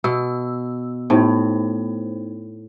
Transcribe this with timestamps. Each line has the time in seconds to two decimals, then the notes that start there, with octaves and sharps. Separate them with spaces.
0.04 B2 E6
1.10 A2 B3 D#4 C5